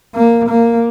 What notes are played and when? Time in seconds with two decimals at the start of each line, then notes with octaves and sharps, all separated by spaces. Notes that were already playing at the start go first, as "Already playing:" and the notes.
0.14 A#3
0.48 A#3